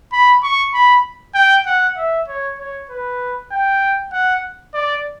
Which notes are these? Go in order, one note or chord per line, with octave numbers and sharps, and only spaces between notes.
B5
C#6
B5
G5
F#5
E5
C#5
C#5
B4
G5
F#5
D5